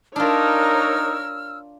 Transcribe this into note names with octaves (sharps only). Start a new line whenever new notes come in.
D4 D#4 F4 A#4 C#5 E6 F6